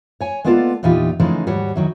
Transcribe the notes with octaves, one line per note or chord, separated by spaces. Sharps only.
C#5 G#5
G#3 A#3 B3 F4 A4 D5
E2 A#2 E3 D#4 F4 G4
C#3 E3 F3 G#3 A3 D#4
D#2 G#2 G3 F#4 C#5
D#3 F#3 E4